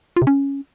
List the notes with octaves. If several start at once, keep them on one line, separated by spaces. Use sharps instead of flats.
F4
C3
C#4